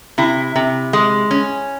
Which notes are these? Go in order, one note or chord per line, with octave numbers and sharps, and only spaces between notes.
C3 E4
C3
G#3
C#4